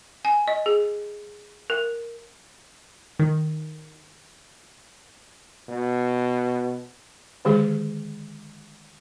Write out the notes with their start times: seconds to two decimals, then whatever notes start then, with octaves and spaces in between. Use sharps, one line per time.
0.25 G#5
0.48 D#5
0.66 G#4
1.70 A#4
3.19 D#3
5.69 B2
7.45 D3 D#3 G#3 G4 G#4